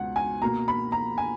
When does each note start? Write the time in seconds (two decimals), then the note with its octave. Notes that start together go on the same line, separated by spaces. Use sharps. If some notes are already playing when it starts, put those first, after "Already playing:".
Already playing: C#2 B2 F#5
0.16 G#5
0.42 B2 A#3 A#5
0.68 B5
0.92 A#5
1.18 G#5